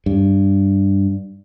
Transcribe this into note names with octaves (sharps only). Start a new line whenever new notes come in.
G2